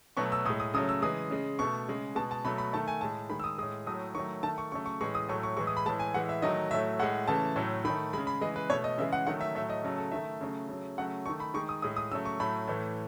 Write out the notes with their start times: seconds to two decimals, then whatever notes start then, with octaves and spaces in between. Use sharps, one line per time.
0.17 B2 F#3 A3 C#6
0.32 E6
0.45 A2 D#6
0.50 G#3
0.60 D#6
0.74 C#3 F#3 A3 D#6
0.89 E6
1.02 C#3 E3 G#3 D#6
1.30 C#3 G#3
1.59 B2 A3 C#6
1.88 C#3 G#3
2.16 B2 G#3 A5
2.31 A5
2.45 B2 F#3 A3 B5
2.58 B5
2.73 D#3 A3 A5
2.88 G#5
3.01 A2 G#3 A5
3.30 D#3 G#3 B5
3.40 E6
3.44 D#6
3.58 G#3 D#6
3.63 A2
3.86 A2 F#3 A3 D#6
4.15 D#3 F#3 A3 C#6
4.43 D#3 A3 A5
4.58 C#6
4.72 C#3 F#3 A3 C#6
4.86 C#6
5.01 A2 E3 G#3 C#6
5.15 D#6
5.29 A2 F#3 A3 C#6
5.43 C#6
5.57 A2 E3 G#3 C#6
5.67 D#6
5.77 B5
5.86 A2 E3 G#3 A5
6.00 G#5
6.14 A2 E3 G#3 F#5
6.29 E5
6.42 D#3 F#3 A3 D#5
6.71 A2 F#3 A3 E5
6.99 A2 G#3 F#5
7.28 C#3 E3 A3 A5
7.56 A2 F#3 A3
7.85 D#3 B5
7.90 A3
8.13 C#3 G#3 B5
8.27 B5
8.41 C#3 E3 G#3 D#5
8.56 B4
8.70 B2 A3 C#5
8.84 D#5
8.98 C#3 E3 G#3 E5
9.13 F#5
9.27 D#3 F#3 A3 F#5
9.41 E5
9.55 A2 F#3 A3 E5
9.70 D#5
9.84 C#3 F#3 A3
9.98 A4
10.12 D#3 A3 E5
10.41 C#3 F#3 A3
10.69 C#3 F#3 A3
10.98 C#3 F#3 A3 F#5
11.26 D#3 A3 C#6
11.40 B5
11.54 D#3 G#3 C#6
11.69 D#6
11.82 A2 G#3 D#6
11.96 D#6
12.12 C#3 F#3 A3 E6
12.25 C#6
12.39 A2 F#3 A3 B5
12.68 A2 E3 A3